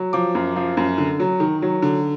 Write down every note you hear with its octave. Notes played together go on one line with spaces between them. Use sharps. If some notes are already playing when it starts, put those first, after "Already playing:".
Already playing: F#3
F3 D6
F#2
F3
F#2
D3
F#3
D#3
F#3
D3